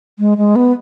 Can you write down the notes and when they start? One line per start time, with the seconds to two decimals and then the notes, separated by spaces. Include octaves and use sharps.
0.19 G#3
0.38 G#3
0.56 B3